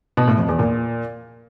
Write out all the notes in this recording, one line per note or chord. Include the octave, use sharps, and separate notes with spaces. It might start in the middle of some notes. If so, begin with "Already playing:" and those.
B2
A2
F2
E2
A#2